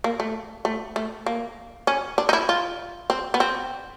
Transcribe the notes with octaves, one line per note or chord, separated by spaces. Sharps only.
A#3
A3
A3
A3
A#3
C#4
D4
D#4
E4
F4
C4
B3
C4